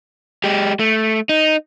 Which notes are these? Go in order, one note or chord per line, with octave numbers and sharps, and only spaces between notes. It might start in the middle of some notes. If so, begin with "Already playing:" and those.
G#3 G4
A3
D#4